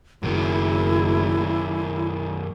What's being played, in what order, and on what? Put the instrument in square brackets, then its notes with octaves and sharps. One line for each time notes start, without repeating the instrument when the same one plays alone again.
[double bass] F#1 [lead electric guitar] F#2 D#3 [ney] E4